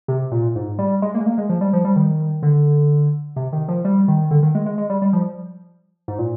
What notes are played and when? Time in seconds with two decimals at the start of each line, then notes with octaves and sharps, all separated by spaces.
0.08 C3
0.32 A#2
0.56 G#2
0.79 G3
1.02 G#3
1.15 A#3
1.21 G#3
1.26 A#3
1.38 G#3
1.49 F3
1.61 G3
1.73 F3
1.85 G3
1.96 D#3
2.43 D3
3.36 C3
3.53 D#3
3.68 F3
3.85 G3
4.08 D#3
4.31 D3
4.43 D#3
4.55 G#3
4.66 G#3
4.78 G#3
4.90 G3
5.02 G3
5.13 F3
6.08 G#2
6.19 A#2